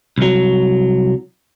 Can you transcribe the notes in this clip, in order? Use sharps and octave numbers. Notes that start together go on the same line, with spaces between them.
C2 F#3